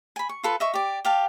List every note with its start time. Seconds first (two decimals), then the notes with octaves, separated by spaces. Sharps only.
0.16 G#5 B5
0.29 C#6
0.44 F4 A4 B4
0.60 D#5 E5 C#6
0.74 G4 D5
1.05 G4 F5 A5